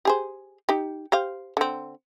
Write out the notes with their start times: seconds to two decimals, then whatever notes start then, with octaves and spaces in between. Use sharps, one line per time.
0.05 G4 G#4 C5
0.69 D#4 G4
1.12 G4 C5 F5
1.57 D3 C4